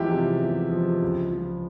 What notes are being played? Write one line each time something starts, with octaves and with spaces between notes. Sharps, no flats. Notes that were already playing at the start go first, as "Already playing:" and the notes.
Already playing: E2 F3 G#3 E4 G4
C3
E2
F3
C#2
F3